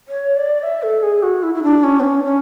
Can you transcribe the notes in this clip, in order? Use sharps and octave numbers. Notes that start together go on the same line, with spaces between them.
C#5
D5
E5
A4
G#4
F#4
E4
E4
D4
C#4
B3
C#4
C#4